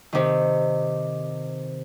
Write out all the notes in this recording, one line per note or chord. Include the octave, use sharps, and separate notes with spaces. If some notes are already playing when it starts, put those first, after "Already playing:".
C3 D#3